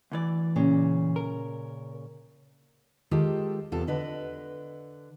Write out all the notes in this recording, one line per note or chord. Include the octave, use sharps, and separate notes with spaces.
D2 E3 D5
A#2 C#3
A#4
D#3 G#3 F4 G4 A4
E2 C3 F4 A4
D3 B4 D#5